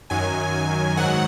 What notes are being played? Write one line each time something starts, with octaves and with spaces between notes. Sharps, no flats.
F#2 D#3 F#3 G#5
G#2 D#3 F#3 F#5